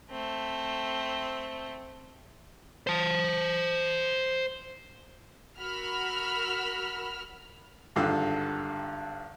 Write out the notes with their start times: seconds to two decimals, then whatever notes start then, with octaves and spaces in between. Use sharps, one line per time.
0.11 A3 C4
2.87 C5 A5
5.60 F#4 A#4 B5 E6 F6
7.96 G#1 G2 D3 F4 A4